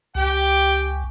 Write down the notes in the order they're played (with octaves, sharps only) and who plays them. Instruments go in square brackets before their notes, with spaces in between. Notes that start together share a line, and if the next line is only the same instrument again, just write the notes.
[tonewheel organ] C#2 [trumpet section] G4 G5